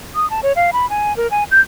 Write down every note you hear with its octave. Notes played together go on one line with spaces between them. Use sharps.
D#6
A5
C#5
F5
B5
G#5
A#4
G#5
G6